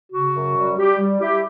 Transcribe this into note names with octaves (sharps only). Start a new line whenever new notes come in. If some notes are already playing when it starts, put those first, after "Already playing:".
C#3 F#4
F#2
G3
G3 G4
G3
E4 G4